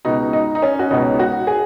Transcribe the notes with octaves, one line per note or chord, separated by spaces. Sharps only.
C#2 B2 D#4
D#4
D#4
C#4
F#4
C#2 B2 D#4
F#4
G#4